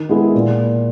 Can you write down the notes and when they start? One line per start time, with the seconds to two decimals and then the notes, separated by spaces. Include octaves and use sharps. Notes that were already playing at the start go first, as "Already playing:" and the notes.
Already playing: D#3
0.09 G#3 B3 E4 G#4
0.35 A#2